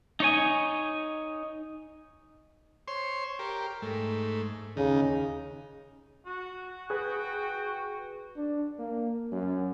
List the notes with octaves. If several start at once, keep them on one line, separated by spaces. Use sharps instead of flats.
D#4 C#5 G#5
C5 C#5 C6
G4 A#4
G#2 A3
D#2 C#3 D#4
F#4
G#4 B4 G5
D4
A#3
F#2